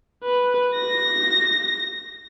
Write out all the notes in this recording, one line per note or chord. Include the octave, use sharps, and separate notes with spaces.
B4
A#6